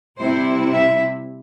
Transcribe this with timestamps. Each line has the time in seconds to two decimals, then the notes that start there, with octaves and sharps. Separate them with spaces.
0.18 C3 G3 E4 C5
0.74 E5